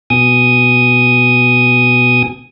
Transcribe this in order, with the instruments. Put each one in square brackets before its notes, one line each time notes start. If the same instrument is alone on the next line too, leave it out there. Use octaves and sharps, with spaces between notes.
[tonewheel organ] B2 G#5 D#6